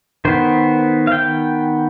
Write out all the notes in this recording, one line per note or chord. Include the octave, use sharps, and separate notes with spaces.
D#3 B3 C5
F5
G5